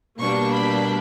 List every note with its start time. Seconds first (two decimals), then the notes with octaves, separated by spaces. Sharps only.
0.19 B2 G3 A#3 D4 C#6
0.53 B5